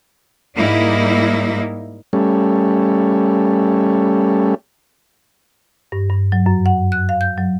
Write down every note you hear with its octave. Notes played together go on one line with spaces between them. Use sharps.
G#2 G3 A#3 D#4 E4
G3 A3 C#4
G2
G2
F#3
F#2
F#5
F#6
F5
G6
F#3